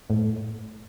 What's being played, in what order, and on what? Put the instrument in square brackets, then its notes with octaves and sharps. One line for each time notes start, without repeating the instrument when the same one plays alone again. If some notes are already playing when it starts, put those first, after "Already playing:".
[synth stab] A2